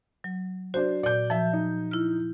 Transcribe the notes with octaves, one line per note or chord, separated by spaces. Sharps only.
F#3
D4 F#4 C5
A#2 D5 G6
F3 E5 A5
D#4
E4 F6